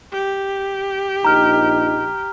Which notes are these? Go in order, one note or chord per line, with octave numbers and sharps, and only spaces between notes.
G4
A#1 D#4 A#5 F6